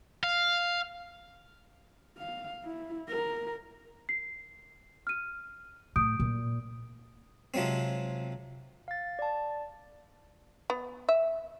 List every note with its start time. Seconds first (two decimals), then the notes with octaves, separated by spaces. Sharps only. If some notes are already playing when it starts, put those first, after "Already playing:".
0.24 F5
2.18 F5
2.64 E4
3.09 A#4
4.09 C7
5.07 F6 D#7
5.96 A2 D#6 G6 D7
6.20 A#2
7.54 C3 F3 F#3 G#3 C4
8.88 F5 A6
9.19 D5 A5
10.70 B3
11.09 E5